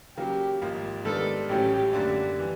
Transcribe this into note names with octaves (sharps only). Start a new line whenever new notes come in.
C#3 F#3 A#3 G4
G#1 G#2 F3 A#3
G#2 D#3 G3 B3 D4 A4
A1 A2 F#3 A3 C#4 G4
F#2 D3 G3 A#3 D4
E3 G3